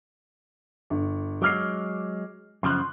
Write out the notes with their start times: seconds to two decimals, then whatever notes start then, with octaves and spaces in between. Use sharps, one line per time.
0.90 G1
1.42 F#3 G#3 D6 F6 C7
2.63 F#2 C#3 F3 C6 F#6